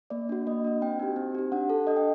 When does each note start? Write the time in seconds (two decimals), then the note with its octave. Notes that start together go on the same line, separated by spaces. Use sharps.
0.10 A#3 D5
0.29 D4 F#4
0.47 A#3 D#5
0.65 D4 F#4
0.81 C4 G5
1.00 D#4 G4
1.16 C4
1.35 D#4 G4
1.52 D4 F#5
1.70 A4
1.87 D4 D#5
1.96 G5